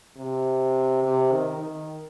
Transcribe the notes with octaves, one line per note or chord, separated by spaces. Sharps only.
C3
C3
D#3
D#3